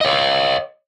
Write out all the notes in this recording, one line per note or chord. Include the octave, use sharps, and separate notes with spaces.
C#5 D#5